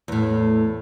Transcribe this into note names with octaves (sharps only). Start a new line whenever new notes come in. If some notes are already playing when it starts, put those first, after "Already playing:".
E2 A2